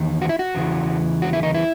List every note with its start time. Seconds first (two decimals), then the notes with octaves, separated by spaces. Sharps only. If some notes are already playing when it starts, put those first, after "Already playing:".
Already playing: E2 D#3
0.22 F#4
0.29 E4
0.39 F#4
0.55 E2 C#3 E3
1.22 F#4
1.33 E4
1.43 D#4
1.55 E4